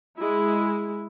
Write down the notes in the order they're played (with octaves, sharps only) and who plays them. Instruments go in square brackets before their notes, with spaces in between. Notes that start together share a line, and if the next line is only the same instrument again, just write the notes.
[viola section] G#3 E4